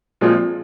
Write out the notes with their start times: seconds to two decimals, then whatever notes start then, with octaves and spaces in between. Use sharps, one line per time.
0.21 A#2 F3 G#3 C4 F4